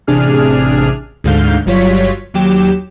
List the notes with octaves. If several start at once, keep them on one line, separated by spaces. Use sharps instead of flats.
A1 C3 D4 G#4 F6
D2 G#2 D3 F5 G6
G1 F#3 G3 F4 C#5 B6
D#2 F#3 G4 E7